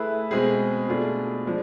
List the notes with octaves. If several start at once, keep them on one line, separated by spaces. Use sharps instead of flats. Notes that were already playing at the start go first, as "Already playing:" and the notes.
Already playing: A3 E4 G#4 B4
B2 G#3 C4 G#4
B2 A3 D4 F4 G#4
F3 G#3 D4